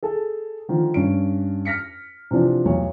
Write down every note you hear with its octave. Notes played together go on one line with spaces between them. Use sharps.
G#4 A4 A5
D3 D#3 F3
G2 C#4 D7
F6 A#6 B6 C#7
C3 E3 F3 D4
B1 E2 C#5